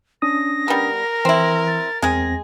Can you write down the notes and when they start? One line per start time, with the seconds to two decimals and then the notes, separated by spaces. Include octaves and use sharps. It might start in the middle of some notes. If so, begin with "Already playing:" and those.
0.22 C#4 D4 D#6 A#6
0.68 G3 B3 A#4
1.25 E3 C4 E4
1.67 A6
2.02 E2 G#3 C4 G#4 G#6 A#6